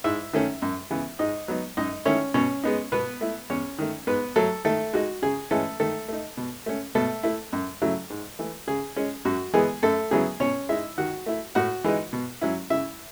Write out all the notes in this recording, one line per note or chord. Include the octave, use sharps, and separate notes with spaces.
G#2 E4 E5
D#3 A3 C#4
F#2
C#3 E3 B3
G#2 D#4 D#5
F#3 B3 D#4
F#2 D#4 D#5
D#3 A3 C#4 E4 C#5
B2 C#4 C#5
G#3 B3 D#4
B2 B3 B4
A3 E4
E2 C#4 C#5
D#3 A3
G#2 B3 B4
F#3 A3 A4
D#3 A3 A4
G#3 D#4 F#4
C#3 G#4
E3 G#3 A3 C#4 E4 A4
D#3 A3 A4
A3 D#4
B2
A3 C#4
B2 A3 A4
A3 E4
F#2
C#3 F#3 A3 E4
G#2
E3 A3
C#3 G#4
G#3 C#4
F#2 F#4
E3 G#3 B3 G#4
F#2 A3 A4
C#3 F#3 B3 E4 G#4
B2 C#4 C#5
G#3 D#4 E4 E5
D#3 F#4 F#5
A3 E4
A2 F#4 F#5
E3 G#3 D#4
B2
F#3 C#4 E4
C#3 E4 E5